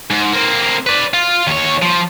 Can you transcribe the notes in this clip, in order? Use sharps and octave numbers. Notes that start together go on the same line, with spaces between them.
G#2
A#3 C4
B4 D5
F4
D#2 C#5
F3